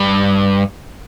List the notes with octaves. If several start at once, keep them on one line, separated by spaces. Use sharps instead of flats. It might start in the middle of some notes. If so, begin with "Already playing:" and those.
Already playing: G2